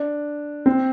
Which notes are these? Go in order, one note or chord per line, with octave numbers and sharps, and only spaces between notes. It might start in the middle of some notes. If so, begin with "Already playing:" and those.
Already playing: D4
C4